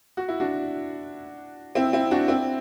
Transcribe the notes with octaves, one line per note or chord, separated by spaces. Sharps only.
F#4
E4
D4 F#4
C4 E4
C4 E4
D4 F#4
C4 E4